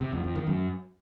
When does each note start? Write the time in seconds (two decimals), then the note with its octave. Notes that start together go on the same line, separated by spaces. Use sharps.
0.01 C3
0.12 F2
0.24 F2
0.35 D#3
0.47 F#2